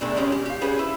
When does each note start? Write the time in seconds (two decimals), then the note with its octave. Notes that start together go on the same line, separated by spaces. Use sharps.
0.01 B2 G#3 A3 D4 A#4 G5
0.16 G#3 C4 C#4 G4
0.32 G4
0.46 G4 F5
0.61 C#4 G#4 B4 C5
0.79 E4